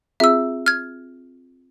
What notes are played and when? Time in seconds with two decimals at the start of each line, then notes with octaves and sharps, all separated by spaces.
0.20 C4 F4 G#4 E5 E6
0.66 F6 G#6